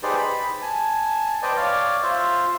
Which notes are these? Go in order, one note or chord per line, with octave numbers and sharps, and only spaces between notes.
D#4 G4 G#4 B4 C5 D5
B5
G#5 A5
B4 C5 D5 D#5 G5 A5
C#5 D5 F5
F4 C5 E5